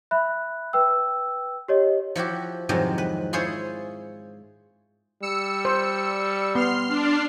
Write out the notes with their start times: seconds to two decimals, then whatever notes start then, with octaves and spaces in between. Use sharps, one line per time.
0.11 E5 B5 F#6
0.73 B4 G5 E6
1.68 G4 C#5 D#5
2.15 F3 E4 F#4 G4
2.69 F2 G#2 C3 D#3 E3 F#3
2.98 B4
3.33 E4 F4 G#4 C5 C#5
5.22 G3 E6 C#7
5.65 C5
6.55 B3 C6 F6 C7
6.88 D4